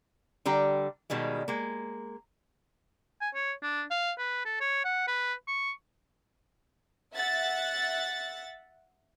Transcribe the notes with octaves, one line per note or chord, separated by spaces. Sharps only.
D3 G3 G5 A#5
B2 D#3 G3 G#3
G#3 A#3
G#5
C#5
D4
F5
B4
A4
C#5
F#5
B4
C#6
E5 F#5 A6